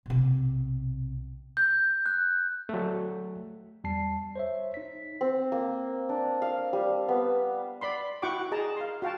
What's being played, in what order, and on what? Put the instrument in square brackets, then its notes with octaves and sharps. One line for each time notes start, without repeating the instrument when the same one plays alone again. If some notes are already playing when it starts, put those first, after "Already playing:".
[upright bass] B1 C3
[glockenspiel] G6
F#6
[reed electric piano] F#3 A3
[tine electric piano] E2 G3 A5 C7
C5 C#5 E5
D#4 B6
[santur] C4
A#3
D4
F5
G3
B3
[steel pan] D5 B5 C6
E4 F#4 F#5 G5 C#6 D6
G#4 D#5 A5 A#5
F5 C6
F#4 F5 G5 A5